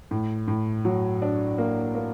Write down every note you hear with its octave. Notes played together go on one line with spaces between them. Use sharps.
A2
A2
F#3
D4
A#3
A#3